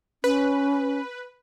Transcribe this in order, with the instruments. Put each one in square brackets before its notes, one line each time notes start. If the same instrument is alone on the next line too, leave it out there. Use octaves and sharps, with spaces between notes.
[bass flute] C#4 [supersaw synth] B4